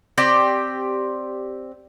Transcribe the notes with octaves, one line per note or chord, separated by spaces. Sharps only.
C4 G4 D5 G5